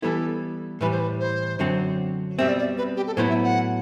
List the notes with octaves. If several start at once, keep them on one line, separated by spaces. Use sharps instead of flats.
E3 G3 B3 E4 A4
A2 E3 G3 B4
C5
B4
C5
F#2 D3 F#3 C4
B2 G3 C4 E5
D5
D5
B4
G4
A4
A2 F#3 B3 E4 C5
E5
F#5